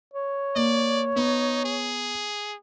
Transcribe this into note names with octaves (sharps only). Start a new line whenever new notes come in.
C#5
A#3 D5
B3 D#4
G#4